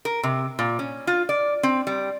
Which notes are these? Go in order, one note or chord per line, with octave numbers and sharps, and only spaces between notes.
A#4
C3
A#2
C#4
F4
D5
C4
G3